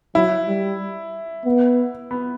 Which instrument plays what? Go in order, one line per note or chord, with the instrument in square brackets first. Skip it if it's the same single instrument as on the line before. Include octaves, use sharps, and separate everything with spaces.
[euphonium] F#3 [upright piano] E4
[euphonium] G3
B3
[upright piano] B3